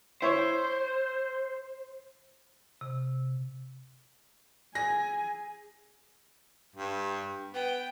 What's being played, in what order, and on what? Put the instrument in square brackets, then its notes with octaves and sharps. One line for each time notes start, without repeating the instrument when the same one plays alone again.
[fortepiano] E4 C#5 [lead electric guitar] C5
[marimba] C3
[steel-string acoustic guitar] G#4 [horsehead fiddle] G#5 [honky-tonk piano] A#6
[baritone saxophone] G2
[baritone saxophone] B3 [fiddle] G5